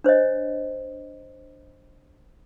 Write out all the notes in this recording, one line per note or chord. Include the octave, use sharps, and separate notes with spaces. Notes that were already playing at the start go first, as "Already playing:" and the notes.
D4 C5 C#5 D#5